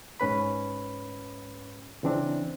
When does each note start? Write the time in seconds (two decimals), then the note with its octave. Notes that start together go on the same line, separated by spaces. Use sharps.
0.20 G#2 C#4 B4 B5
2.03 C#3 E3 C4 D4